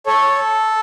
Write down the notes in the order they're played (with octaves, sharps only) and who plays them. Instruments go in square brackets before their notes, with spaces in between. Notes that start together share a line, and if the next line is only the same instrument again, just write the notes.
[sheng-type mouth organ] A4 C#5